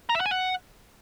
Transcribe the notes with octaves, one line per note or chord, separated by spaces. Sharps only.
A#5
E5
F#5
G#5
F#5